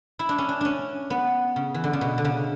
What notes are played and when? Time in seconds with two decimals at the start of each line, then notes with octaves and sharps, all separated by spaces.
0.19 E4
0.29 D4
0.38 C#4
0.49 D4
0.61 C#4 D4
1.10 B3
1.56 C#3
1.74 E3
1.84 D3
1.93 C#3
2.01 B2
2.18 D3
2.25 C#3